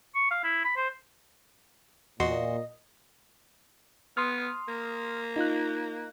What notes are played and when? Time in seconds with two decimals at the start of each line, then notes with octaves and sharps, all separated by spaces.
0.15 C#6
0.31 F5
0.44 E4
0.64 B5
0.76 C5
2.20 E2 A#2 F#4 D#5 C6
4.17 B3 C6 D#6 F6
4.68 A#3
5.36 D#4 F4 F#6